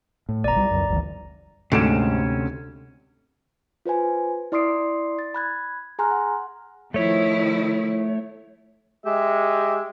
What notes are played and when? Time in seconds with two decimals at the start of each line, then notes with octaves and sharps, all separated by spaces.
0.29 A2
0.44 F1 B1 D5 A#5
0.56 B1 G3
0.71 C#2 F#2
0.89 G1 D2 E3
1.72 D2 G#2 C3 C#4 D7 E7
3.86 F4 B4 C5 G#5
4.52 E4 D5 C6 D#6 C7 D7
5.19 A6
5.34 B5 F#6 G#6
5.99 G#4 G#5 A#5 C6 F6 F#6
6.11 F#5
6.94 D#3 F3 A3 E4 C#5
9.06 G#3 G4 E5